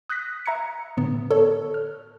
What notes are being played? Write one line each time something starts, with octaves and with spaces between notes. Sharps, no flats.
D#6 F#6 G6 A#6 B6
E5 A#5 G#6 C#7
A2 D3 B3
A4 C#5
F6